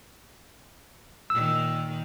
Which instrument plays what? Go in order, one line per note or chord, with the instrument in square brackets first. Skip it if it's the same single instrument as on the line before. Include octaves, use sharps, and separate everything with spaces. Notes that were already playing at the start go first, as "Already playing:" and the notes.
[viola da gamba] A#2 D#3 [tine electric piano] E6